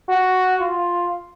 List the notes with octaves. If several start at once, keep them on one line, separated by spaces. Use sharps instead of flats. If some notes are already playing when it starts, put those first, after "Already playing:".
F#4
F4